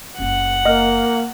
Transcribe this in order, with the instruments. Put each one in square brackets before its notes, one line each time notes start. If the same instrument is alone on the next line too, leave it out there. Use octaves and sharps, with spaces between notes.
[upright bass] F#1 C#4 [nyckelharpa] F#5
[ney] A#3 [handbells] D#5 F6